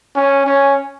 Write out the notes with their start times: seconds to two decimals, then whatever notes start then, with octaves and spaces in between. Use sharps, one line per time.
0.15 C#4 G#5
0.46 C#4